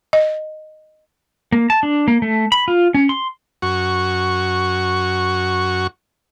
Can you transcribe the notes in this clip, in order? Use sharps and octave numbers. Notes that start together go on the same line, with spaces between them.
D#5
A#3
A5
D4
A#3
A3
B5
F4
C#4
C6
F#2 F#4 C#6